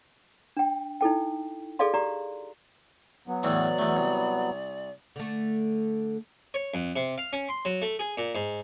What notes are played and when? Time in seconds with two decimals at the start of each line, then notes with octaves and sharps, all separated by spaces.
0.57 D4 G5
1.01 D#4 E4 A4 G5
1.79 G#4 A4 D5 D#5 F5 C6
1.94 G4 D5 A#5
3.28 F#3 B3
3.43 E2 A2 E3 D5
3.78 E2 A3
3.97 C2
5.16 D3 A3
6.54 C#5
6.74 F2
6.96 C3
7.18 F5
7.33 C#4
7.49 C6
7.65 F#3
7.82 A3
7.99 G#4
8.18 A#2
8.35 G#2